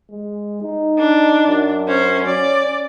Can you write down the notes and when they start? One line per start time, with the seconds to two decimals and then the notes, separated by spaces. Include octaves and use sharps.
0.11 G#3
0.63 D#4
0.98 D4
1.48 F#2
1.88 C#4 C5
2.25 C#4 D5